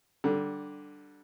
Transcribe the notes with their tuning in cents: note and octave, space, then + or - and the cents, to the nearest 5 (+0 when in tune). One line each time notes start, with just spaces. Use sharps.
D3 +0 G3 -25